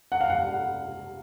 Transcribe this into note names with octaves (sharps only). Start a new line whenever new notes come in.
F#5
F5
F#5